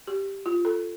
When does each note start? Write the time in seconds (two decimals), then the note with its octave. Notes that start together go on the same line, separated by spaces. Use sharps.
0.07 G4
0.46 F4
0.65 A4